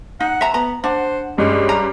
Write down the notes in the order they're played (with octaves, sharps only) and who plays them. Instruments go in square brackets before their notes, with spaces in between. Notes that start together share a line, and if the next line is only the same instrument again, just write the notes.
[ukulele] D#4 [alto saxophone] F#5
[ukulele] E5 A#5
[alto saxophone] B3 [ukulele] A#5
[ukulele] D4 [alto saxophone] C5 [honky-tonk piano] F#5
[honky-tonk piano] G2 C#4 [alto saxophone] G#3
[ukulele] A#5